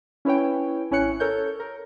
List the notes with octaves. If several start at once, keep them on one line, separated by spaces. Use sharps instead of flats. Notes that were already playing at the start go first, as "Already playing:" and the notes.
C#4 E4 B4 C#5 G5
A1 C#4 E4 C#5 F#6 C#7
A4 A#4 C#5 G6
A#4